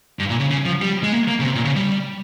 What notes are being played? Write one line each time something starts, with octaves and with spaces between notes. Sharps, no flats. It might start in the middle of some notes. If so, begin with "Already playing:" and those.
G2
A#2
C#3
C#3
F3
G3
G#3
A#3
A#3
C#3
C3
A#2
C#3
G3